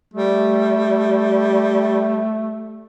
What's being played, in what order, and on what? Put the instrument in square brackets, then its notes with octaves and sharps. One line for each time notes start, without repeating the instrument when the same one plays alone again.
[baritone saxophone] G3 [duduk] A3